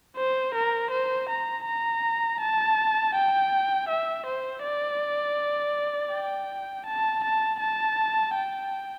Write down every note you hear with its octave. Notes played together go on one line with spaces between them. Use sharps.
C5
A#4
C5
A#5
A#5
A5
G5
E5
C5
D5
G5
A5
A5
A5
G5